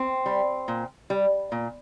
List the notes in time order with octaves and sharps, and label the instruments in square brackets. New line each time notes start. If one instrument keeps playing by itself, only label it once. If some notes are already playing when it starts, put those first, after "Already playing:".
Already playing: [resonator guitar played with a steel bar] C4
G3
A#2
G3
A#2